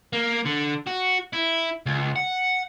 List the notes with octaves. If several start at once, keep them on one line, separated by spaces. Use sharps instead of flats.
A#3
D3
F#4
E4
C#2
F#5